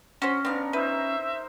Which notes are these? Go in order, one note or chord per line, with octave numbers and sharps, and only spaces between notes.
C#4 F#4 C5
B3 C4 D4 A#4 F5
D#4 B4 C5 E5